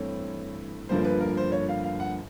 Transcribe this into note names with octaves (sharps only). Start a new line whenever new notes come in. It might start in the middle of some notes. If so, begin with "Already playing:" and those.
Already playing: G2 E3 A3 C4 E4 C#5
G1 G2 D3 F3 A#3 C5
B4
A#4
C5
C#5
F5
F5
F#5